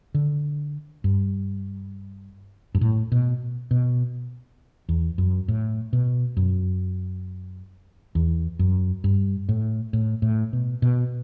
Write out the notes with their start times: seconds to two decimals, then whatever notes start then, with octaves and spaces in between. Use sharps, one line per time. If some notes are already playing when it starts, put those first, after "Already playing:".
0.14 D3
1.04 G2
2.75 G2
2.81 A2
3.12 B2
3.71 B2
4.89 E2
5.18 F#2
5.48 A2
5.93 B2
6.37 F#2
8.15 E2
8.59 F#2
9.04 G2
9.49 A2
9.93 A2
10.22 A2
10.53 B2
10.82 B2